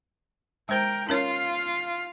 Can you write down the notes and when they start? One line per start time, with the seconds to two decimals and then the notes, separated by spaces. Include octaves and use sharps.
0.69 G#3 A#4 C5 G5 A#5
1.09 C#4 F4 A#4 C#5 F5